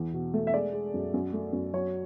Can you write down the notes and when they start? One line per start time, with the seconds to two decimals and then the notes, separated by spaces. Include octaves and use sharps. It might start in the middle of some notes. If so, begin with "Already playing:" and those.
Already playing: E2
0.13 B2
0.34 A3
0.47 E5
0.54 G#3 D5
0.73 G#3
0.94 F#2
1.14 F#2
1.33 A3
1.53 F#2
1.73 F#3 C#5